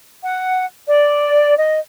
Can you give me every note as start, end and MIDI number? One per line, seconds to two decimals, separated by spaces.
0.23 0.65 78
0.87 1.55 74
1.58 1.80 75